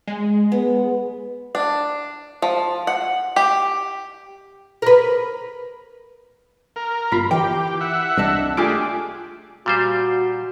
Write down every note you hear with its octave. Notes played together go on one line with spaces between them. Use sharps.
G#3
B3
D4
F3
F#5
G4
A#4 B4
A#4
G1 F4 B5
E3 G4 G5
E5 F#5
C2 D4 D#5 A5
A3 D4 F4 G4 G#4 G#5 D6
A#2 G3 F#4 C5